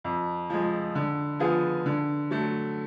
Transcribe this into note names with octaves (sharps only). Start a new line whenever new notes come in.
F2
F3 G#3
D3
F3 B3 F4 G#4
D3
F#3 A3